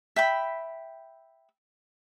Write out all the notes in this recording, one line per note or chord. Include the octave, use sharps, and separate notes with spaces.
E5 G5 B5